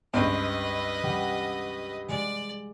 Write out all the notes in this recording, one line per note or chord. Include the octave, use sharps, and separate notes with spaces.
C#2 G2 C4 B4 D#5
G3 F#5
G#3 D5